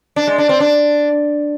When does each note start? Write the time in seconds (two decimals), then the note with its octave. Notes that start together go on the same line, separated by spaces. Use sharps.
0.16 D4
0.27 G#3
0.38 D4
0.49 C4
0.60 D4